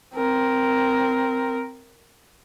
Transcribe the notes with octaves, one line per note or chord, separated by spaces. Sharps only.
C4 A#4